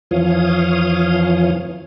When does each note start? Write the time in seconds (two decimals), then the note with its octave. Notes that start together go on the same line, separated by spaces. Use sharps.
0.11 F2 E3 F3 C#5 F5 D#6